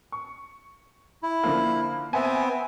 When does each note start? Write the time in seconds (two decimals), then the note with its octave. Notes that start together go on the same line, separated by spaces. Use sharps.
0.12 C#6
1.23 E4
1.43 D3 F3 A#3
2.13 B3 C4 E5 G5 G#5